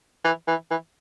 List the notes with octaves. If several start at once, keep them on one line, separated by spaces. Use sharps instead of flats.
E3
E3
E3